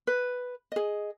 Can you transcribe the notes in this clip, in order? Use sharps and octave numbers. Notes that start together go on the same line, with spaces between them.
B4
G#4 D#5